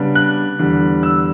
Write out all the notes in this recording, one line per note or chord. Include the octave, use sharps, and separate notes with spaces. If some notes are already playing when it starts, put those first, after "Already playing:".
Already playing: C#3 G3 B3 D4
F#6
E2 D3 G3
E6